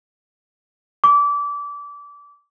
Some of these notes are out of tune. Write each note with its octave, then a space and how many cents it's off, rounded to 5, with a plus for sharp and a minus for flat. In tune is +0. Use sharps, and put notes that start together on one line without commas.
D6 -25